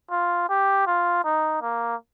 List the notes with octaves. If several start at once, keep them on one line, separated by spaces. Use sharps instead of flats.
F4
G4
F4
D#4
A#3